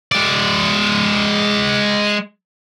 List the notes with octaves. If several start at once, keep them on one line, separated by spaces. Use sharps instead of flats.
G#3 D5